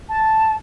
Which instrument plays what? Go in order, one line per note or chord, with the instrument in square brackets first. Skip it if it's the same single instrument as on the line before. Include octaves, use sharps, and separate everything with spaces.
[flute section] A5